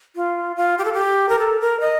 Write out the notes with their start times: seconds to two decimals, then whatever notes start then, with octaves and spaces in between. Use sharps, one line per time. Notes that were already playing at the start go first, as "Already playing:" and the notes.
0.16 F4
0.56 F4
0.78 G4
0.85 A4
0.93 G4
1.29 A#4
1.39 A4
1.61 A#4
1.80 D#5